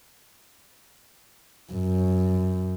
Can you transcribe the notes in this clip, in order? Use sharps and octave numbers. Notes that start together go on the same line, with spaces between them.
F#2